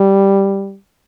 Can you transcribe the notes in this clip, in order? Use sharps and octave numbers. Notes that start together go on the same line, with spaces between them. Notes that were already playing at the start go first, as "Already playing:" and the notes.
Already playing: G3